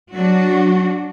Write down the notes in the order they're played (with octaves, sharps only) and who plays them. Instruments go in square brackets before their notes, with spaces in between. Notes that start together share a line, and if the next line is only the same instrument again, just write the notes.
[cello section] F#3 D4 F#4